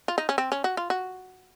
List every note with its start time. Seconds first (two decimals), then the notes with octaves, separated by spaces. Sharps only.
0.08 F4
0.18 D#4
0.29 C#4
0.38 C4
0.52 C#4
0.64 F#4
0.77 F4
0.90 F#4